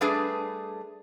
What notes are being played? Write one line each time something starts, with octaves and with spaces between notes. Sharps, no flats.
G3 A3 D4 G#4 B4